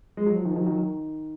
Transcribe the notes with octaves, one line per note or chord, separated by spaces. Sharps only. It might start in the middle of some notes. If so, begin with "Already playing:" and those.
G#3
F#3
F3
D#3
F3
D#3 F#3
D#3 F#3
D#3